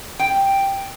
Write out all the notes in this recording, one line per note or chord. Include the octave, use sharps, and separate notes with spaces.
G5